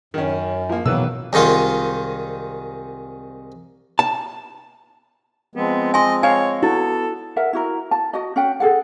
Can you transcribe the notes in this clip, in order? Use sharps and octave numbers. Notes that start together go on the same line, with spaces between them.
F#2 D#3 C#4
F3 A#3
B2 D#3 E3 F#3 A#3 B3 B4 E6
C2 G#2 D#3 F4
A5
F3 G#3 B3 C4
D#5 G#5 C6
C#5 F5 G#5
B3 E4 F#4 A4
A#4 E5 F#5
E4 F#4 A#4
A5
F#4 D#5
C#4 F#5 G5
G#4 A4 F#5